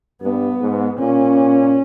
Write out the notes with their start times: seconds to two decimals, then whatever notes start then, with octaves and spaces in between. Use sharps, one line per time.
0.22 G2 B3
0.61 G#2
0.99 A#2 C#4